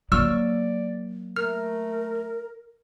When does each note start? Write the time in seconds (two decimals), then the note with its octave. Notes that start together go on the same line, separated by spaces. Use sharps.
0.12 F#3 A#3 D5 C#6 E6 F6
1.36 A3 A#4 F6